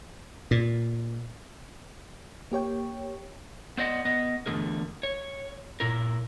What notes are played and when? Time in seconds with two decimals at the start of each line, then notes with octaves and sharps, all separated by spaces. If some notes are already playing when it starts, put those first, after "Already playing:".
0.51 A#2
2.52 A#3 G4 C#5 G5
3.78 B3 C5 D5 D#5 F#5
4.05 B3 B4 D#5
4.46 E2 G#2 D3 A3 G#4 A#4
5.03 C#5
5.80 A#2 E4 A#4